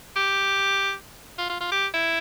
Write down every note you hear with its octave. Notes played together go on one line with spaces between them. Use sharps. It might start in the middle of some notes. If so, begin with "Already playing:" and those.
G4
F4
F4
F4
G4
E4